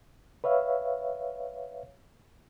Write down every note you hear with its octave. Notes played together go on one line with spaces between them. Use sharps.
B4 C#5 E5 F5